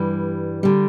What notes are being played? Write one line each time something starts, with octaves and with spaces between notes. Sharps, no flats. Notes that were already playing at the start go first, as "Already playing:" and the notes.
Already playing: G2 E3 G3
D3 G3